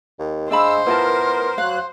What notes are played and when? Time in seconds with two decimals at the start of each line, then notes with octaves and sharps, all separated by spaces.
0.19 D#2
0.51 G#3 D4 C5 F5 B5 E6
0.86 B3 E4 F4 A#4 A5
1.58 F#3 F5 F#6